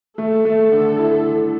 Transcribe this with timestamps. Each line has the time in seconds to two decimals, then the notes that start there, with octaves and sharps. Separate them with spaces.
0.18 A3 A4
0.45 A3
0.72 D3
0.99 E4
1.26 D3